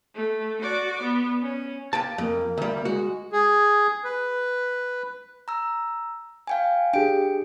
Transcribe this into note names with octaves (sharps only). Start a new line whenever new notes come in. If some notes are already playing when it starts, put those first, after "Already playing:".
A3
F#4 D5
B3
C#4
A#3 G5 A5
F2 A#3
D2 G3
G#3 F#4
G#4
B4
A#5 E6
F5 G5 G#5
D4 G4 G#4 G5 D7